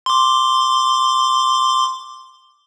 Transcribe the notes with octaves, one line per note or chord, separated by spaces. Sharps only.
C6 D6